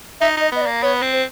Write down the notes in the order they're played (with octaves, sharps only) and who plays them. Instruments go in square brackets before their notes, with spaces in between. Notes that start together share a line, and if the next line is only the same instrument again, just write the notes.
[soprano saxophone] D#4 [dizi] E5
[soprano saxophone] D#4 [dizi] D#5
[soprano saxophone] B3 [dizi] D#5
[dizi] D5
[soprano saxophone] A#3
[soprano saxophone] B3 [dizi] C#5
[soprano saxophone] C4
[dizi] C5